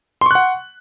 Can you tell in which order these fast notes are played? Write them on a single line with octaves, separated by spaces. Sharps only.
C6 C#6 F#6 F#5